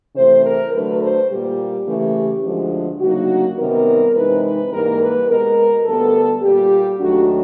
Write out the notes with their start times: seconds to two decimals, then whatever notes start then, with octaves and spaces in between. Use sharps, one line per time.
0.16 C3 E3 A3 C5
0.45 A#4
0.73 D3 F#3 A3 B4
1.01 C5
1.30 A#2 G3 A#3 G4
1.86 C#3 E3 A3
2.44 D2 D3 F3 G#3
3.00 D2 C#3 F#3 A#3 D#4 F#4
3.58 C3 D#3 G3 B3 A#4
4.14 C3 E3 G#3 C4 D#4 B4
4.43 B4
4.71 G#2 E3 G3 A#3 A#4
5.00 B4
5.28 B2 G#3 B3 A#4
5.85 D2 D3 G3 B3 A4
6.42 A#2 G3 A#3 G4
6.99 D#2 D#3 F#3 A3 D4 F#4